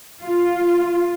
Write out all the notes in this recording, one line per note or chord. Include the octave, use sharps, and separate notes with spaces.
F4